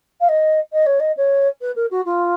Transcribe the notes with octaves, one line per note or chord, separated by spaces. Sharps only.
F5
D#5
D#5
C#5
D#5
C#5
B4
A#4
F#4
F4